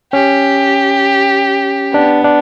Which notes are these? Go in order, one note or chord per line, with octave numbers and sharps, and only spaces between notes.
C#4 G4
B3 D4
D4